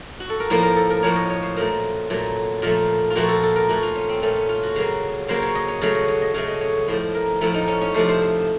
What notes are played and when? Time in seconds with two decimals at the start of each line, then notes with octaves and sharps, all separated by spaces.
0.20 F#4
0.30 A4
0.40 A#4
0.50 A2 F3 A#3 C5
0.63 A#4
0.76 A4
0.90 A#4
1.03 A2 F3 A#3 C#5
1.16 D#5
1.30 C#5
1.42 C5
1.57 A#2 F#3 A3 A#4
2.10 A#2 F#3 A3
2.62 A#2 F3 A3 A#4
3.10 F4
3.15 A#2 F3 A3 F#4
3.29 A4
3.43 A4
3.56 A#4
3.69 A#2 A3 F#4
3.83 F4
3.95 C#4
4.09 C4
4.22 A#2 A3 C#4
4.36 C#4
4.49 F4
4.63 F#4
4.76 C#3 F#3 A#3
5.28 C#3 F#3 A#3 C5
5.42 C#5
5.55 D#5
5.68 C#5
5.82 C#3 F#3 A3 C#5
5.95 D#5
6.08 C#5
6.22 D#5
6.34 C#3 F#3 A3 C#5
6.47 D#5
6.61 C#5
6.88 A2 F3 A3 C5
7.15 A#4
7.41 A2 F3 A3 A4
7.54 D#4
7.68 C#4
7.81 C#4
7.94 C3 F3 A3 C5
8.09 C5
8.22 C5